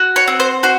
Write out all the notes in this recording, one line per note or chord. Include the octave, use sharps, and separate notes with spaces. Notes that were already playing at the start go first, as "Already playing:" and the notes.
Already playing: F#4
C#5
C4
C5
F#4 C5